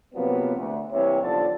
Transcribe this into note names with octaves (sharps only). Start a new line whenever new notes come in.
C3 F3 F#3 A#3 B3
D2
C2 C3 E3 A#3 C#5
B1 D3 F3 F4 D5 A5